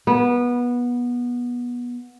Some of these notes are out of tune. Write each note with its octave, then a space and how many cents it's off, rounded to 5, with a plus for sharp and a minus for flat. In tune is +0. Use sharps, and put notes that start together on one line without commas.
B3 -20